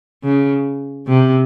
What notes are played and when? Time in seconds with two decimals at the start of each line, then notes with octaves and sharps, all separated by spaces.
0.24 C#3
1.07 C3